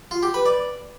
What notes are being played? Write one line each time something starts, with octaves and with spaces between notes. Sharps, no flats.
F4
G4
B4
D5